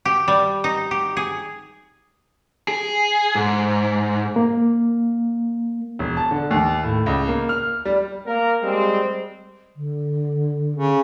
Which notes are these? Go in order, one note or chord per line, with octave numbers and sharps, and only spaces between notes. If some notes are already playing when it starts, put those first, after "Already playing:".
G4
G3
D#4
G4
G#4
G#4
G#2
A#3
E1
A5
D3
D#2
A2
C#2
A#3
F6
G3
A#3 A#4
G3 G#3 C4
D3
C#3